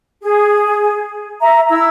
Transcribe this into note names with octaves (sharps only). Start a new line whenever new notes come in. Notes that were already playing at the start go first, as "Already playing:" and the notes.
G#4
E5 A#5
E4 E6